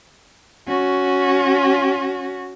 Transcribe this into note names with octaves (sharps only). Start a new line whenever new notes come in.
C#4 F#4